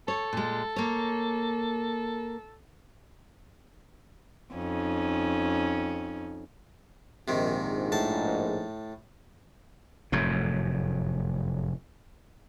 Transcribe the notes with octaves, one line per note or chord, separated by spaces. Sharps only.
A4 C#5
A#2 G#3
A#3 C#5
F2 C#4 D#4
A#1 G#2 C3 D#3
A2 A5
F1 F#2 A2